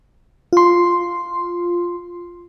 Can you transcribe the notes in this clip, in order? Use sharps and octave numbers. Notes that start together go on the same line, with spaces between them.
F4 C6